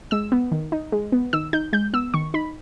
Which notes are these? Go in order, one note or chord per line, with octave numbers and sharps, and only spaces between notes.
G#3 E6
B3
D#3
D#4
G#3
B3
D#3 E6
D#4 G6
G#3 G6
B3 E6
D#3 C#6
D#4 B5